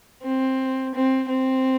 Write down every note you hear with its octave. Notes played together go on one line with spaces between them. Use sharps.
C4
C4
C4